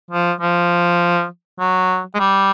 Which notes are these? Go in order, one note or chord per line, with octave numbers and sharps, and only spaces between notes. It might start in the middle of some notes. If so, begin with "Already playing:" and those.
F3
F3
F#3
G#3
G3